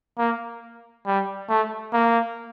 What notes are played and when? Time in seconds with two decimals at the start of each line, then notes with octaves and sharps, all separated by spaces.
0.18 A#3
1.06 G3
1.49 A3
1.93 A#3